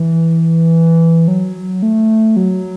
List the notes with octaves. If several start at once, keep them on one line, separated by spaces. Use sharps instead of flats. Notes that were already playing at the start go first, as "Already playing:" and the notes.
Already playing: E3
F#3
A3
F#3